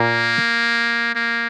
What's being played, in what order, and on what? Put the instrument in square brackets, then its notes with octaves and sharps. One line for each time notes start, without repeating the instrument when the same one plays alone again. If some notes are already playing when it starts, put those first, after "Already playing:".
Already playing: [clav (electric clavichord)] A#2 [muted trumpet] A#3
[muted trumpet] A#3